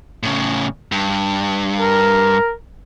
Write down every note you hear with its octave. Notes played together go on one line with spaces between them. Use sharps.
A2 C#3
G2
A#4